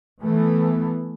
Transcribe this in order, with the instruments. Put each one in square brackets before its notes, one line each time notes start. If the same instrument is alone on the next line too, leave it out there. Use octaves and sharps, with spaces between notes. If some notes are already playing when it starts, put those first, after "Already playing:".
[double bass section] E3 A3 B3